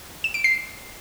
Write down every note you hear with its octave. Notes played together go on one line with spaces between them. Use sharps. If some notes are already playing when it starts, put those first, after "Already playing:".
E7
D7
C7